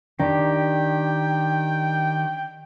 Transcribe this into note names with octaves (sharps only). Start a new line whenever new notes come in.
D#3 D4 G4 G5